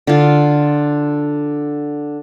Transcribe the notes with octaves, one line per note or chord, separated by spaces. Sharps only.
D3 F4